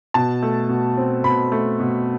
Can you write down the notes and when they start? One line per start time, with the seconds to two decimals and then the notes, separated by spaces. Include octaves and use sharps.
0.14 B2 A5
0.43 A3
0.69 B2
0.98 C4
1.24 B2 B5
1.52 A3
1.80 B2